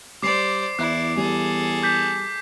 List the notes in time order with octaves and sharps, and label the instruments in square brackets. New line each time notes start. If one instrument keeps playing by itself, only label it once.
[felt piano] G3 [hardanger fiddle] C5 D5 [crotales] D6 C7
[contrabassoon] E2 [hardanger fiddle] E4 D5 [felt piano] E5 F#6
[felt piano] G3 [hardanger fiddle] G#4 A4
[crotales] D6 G6 B6